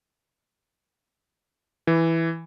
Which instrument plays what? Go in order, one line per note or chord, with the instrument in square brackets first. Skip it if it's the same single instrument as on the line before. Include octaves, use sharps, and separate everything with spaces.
[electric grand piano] E3